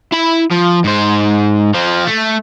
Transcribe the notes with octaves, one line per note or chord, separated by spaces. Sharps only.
E4 B5
F3
G#2 C5
F3 C4
A3